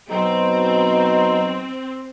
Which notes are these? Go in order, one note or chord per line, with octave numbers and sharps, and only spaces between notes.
B2 F#3 C4 D#4